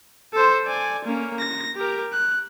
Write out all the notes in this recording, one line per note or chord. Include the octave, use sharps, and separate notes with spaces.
A4 C5
D5 G#5
A#3 C#4
A#6
G4 A#4
F#6